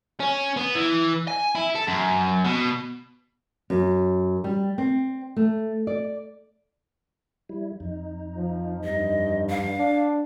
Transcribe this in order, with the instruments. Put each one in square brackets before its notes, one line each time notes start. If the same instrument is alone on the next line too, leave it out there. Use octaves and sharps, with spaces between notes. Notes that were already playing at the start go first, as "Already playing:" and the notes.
[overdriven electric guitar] C#4
B3
E3
G#5
E4
A4
F#2
B2
[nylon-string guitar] F#2
G3
C4
A3
D5
[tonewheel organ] G3 E4
F2 D#4
[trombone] F3
[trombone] G2 [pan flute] D#5
[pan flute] F5
[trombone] D4